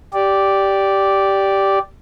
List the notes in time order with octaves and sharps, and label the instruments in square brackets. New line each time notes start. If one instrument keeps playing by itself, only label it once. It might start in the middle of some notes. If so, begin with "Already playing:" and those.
[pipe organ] G4 D5